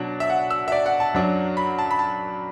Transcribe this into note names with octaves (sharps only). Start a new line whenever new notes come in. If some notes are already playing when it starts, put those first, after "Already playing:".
Already playing: B2 F#3 D4
E5
F#5
E6
E5
D5
F#5
A5
F#2 F#3 D4
B5
A5
B5
A5